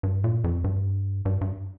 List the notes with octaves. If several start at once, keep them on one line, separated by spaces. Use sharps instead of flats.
G2
A#2
F2
G2
G2
G2